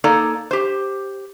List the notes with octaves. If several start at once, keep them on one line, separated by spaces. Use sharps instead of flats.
A#3 D#4 A4 D5 A#5
G4 C5